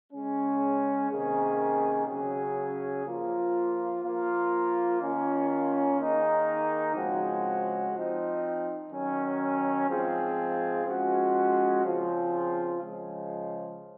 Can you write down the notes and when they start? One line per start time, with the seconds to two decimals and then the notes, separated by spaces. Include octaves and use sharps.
0.13 C#3 G#3 C#4
1.10 C3 D#3 A#3 C#4 G#4
2.07 C#3 F#3 C#4 G#4
3.05 F3 A#3 F4
4.03 F3 A#3 F4
5.01 D#3 A#3 C#4 F4
5.98 D#3 A#3 D#4 G#4
6.95 C#3 F3 G#3 C4 F#4
7.93 F3 C4 D#4
8.91 D#3 F#3 C#4
9.89 G#2 F3 C4 F4 G#4
10.86 F3 G#3 C#4 F#4
11.84 C#3 F3 C4 F4 G#4
12.82 C#3 F3 G#3